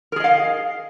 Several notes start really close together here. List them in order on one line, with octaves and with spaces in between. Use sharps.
A#4 G#4 D#5 F5